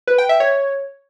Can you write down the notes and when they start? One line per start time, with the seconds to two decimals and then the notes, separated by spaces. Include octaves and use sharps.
0.07 B4
0.18 G5
0.29 E5
0.40 C#5